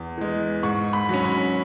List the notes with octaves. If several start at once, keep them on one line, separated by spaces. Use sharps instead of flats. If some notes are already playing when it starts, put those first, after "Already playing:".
Already playing: E2
E3 G#3
G#2 C#6
B5
F#3 C#4
B5